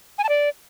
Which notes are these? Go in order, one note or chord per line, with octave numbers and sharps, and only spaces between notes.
G#5
A5
D5